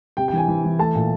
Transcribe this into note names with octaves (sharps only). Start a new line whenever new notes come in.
C3 G5
G5
E3 G#5
E3
E3
A3 A5
A#2